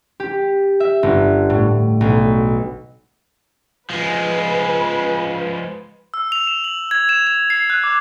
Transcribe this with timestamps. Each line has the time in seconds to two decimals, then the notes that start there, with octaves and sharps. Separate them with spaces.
0.20 G4
0.80 E5
1.03 G1
1.50 A2
2.01 B1
3.90 F3 G#3 B4
6.14 E6
6.32 F7
6.47 E7
6.64 F#7
6.91 G#6
7.09 E7
7.27 E7
7.50 C7
7.70 F#6
7.84 D6